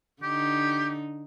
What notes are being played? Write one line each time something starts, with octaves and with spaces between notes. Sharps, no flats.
D3 D#4 G4